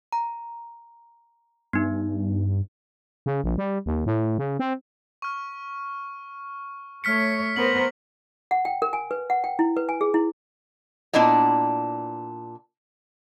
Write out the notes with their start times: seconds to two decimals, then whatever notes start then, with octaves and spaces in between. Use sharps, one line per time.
0.13 A#5
1.73 G2 B3 D#4
3.26 C#3
3.44 A#1
3.58 G3
3.86 D#2
4.06 A2
4.38 C#3
4.59 C4
5.22 C#6 F6
7.04 A3 C#5 F6 B6 C#7
7.56 B3 A#4 C5 F#7
8.51 F#5
8.65 G5
8.82 A#4
8.93 G#5
9.11 B4
9.30 F#5
9.44 G5
9.59 E4
9.77 B4
9.89 G#5
10.01 G#4
10.14 E4
11.13 A#2 B3 D4 E4 D5 D#5